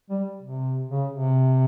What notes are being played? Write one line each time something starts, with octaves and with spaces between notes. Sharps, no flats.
G3
C3
C#3
C3